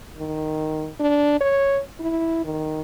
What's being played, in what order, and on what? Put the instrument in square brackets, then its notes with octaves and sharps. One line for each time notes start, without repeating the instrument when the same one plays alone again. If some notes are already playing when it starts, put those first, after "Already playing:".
[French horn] D#3
D4
C#5
E4
D#3